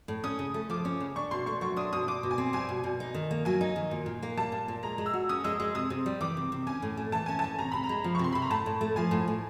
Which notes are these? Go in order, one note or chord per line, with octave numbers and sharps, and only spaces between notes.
A2
C#4 D#6
C#3
A3
F3 D6
C#4
C#3
D4 C#6
B2 C6
A3 C#6
F#3 C#6
D4 D#6
B2 D#6
B2 D6
B2
G#5
C4
G3 G#5
B2
B2
D#4
D#3
A#3
F#3 G#5
D#4
D#3
A#2
A#2
A#3
G3 A5
A#2
A#2
G#3 A#5
G#3
E6
F#4
C#4 D#6
G#3 E6
G#3 E6
C3 D#6
C3
G3
E3 D6
C3
C3
C#4 G#5
A2
A3
E3 A5
C#4 G#5
A2 A5
C3 A#5
C3 B5
A#5
G#3
F3
C#6
C3 C6
C3 B5
A#5
A2 A5
A2
A3
F3 G#5
A2
A2